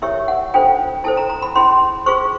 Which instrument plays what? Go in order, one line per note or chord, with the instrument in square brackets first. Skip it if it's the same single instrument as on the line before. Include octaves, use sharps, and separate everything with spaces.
[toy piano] E4 G4 A#4 C#5 E5
F#5
D4 F4 A4 C5 G5
E4 A4 C5 A5
A#5
A#5
B5
C#4 E4 G#4 C6
F4 G#4 C5 C#6